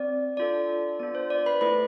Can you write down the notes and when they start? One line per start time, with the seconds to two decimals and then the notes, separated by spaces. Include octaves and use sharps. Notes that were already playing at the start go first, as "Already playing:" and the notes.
Already playing: C4 D5
0.37 D4 F4 A4 D5
0.99 B3 D4 F4 D5
1.15 C5
1.30 D5
1.46 B4 B5
1.61 A3 E4 A4 B4 B5